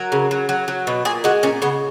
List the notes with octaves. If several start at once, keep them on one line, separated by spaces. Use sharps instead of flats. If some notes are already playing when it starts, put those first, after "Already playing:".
Already playing: F#3 A#4
C#3
F#3
F#3
F#3
B2
A#2 G#4
G#3 F#4
A#2 C#4
C#3 B3